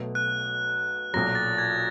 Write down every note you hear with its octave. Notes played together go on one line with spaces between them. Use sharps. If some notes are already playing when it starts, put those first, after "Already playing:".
Already playing: B1 B2 F#3 A3
F#6
B1 A#2 F#3 A#6
A6
G#6